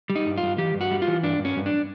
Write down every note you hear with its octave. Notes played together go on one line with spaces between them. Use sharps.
G3
D#4
G2
F4
G2
E3 G4
G2
F#4
G3
F4
E3
G2 D4
G2
C#4
G2
D4